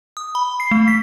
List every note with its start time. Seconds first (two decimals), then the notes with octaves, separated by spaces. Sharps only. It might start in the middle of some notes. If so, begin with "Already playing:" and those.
0.17 D#6
0.35 B5
0.60 C7
0.71 A3
0.88 B6